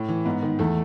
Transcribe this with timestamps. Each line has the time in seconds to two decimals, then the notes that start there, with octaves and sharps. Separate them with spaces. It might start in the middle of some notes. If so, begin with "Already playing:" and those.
Already playing: A2
0.08 E3
0.25 G#2 B3
0.42 D#3
0.59 E2 A3